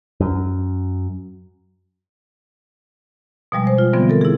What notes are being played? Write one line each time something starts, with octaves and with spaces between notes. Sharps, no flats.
F#2
B2 F3 G3 G#3
C5
F4
D3 E3 F3 G3 B3 C4
A4 A#4
E4 G#4